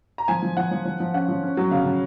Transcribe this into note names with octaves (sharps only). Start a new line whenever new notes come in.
A#5
F3 G#5
F3
F3 F#5
F3
F3
F3
C#4 F#5
F3
C#4
F#3
C#3 F5
C#3